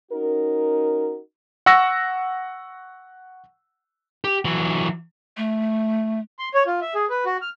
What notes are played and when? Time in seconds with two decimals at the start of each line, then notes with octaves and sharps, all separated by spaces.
0.12 C#4 D#4 F#4 A#4
1.66 F#5 C#6 E6 A#6
4.24 G4
4.45 E3 F#3
5.37 A3
6.39 C6
6.54 C#5
6.67 F4
6.82 E5
6.95 G#4
7.10 B4
7.26 F#4
7.42 F6